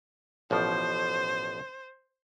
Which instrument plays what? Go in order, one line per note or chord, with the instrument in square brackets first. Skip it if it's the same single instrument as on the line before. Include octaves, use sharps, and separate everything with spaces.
[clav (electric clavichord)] A1 B2 F3 [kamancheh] C5